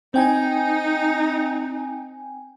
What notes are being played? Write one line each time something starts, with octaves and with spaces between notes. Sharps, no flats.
C4 D#4 G5 G#5